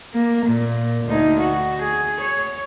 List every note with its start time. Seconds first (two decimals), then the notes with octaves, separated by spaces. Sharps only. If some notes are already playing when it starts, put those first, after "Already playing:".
0.13 A#3
0.47 A#2
1.06 D2 D#4
1.40 F#4
1.83 G#4
2.22 C#5